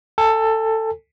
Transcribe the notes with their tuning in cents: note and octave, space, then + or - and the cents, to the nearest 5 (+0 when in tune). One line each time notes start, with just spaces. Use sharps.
A4 +15 G#5 -20